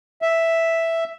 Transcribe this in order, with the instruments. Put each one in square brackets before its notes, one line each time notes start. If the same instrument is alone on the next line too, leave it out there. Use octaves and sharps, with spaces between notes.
[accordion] E5